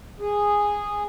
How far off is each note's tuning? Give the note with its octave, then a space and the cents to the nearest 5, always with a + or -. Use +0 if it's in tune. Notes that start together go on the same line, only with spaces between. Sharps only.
G#4 -10